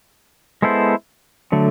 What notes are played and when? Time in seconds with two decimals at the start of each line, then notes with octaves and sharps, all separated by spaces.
0.62 G#3 B3 E4 A4 C5
1.52 D3 F#3 A3